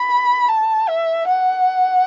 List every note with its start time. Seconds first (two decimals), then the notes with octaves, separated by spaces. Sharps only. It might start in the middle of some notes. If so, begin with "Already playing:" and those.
Already playing: B5
0.49 A5
0.88 E5
1.27 F#5